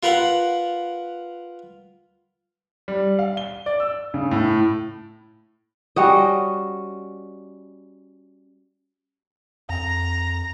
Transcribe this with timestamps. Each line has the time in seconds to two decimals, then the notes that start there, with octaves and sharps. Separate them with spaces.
0.03 F4 A#4 B4 F5 F#5
2.88 G3
3.19 F5
3.37 G7
3.66 D5
3.80 E6
4.14 C#3
4.31 A2
5.96 G3 C#4 F#4 D#5
9.69 F2 A#5